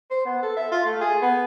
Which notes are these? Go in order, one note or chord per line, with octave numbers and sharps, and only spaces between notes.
C5
B3
A4
E5
F4
A3
G#4
B3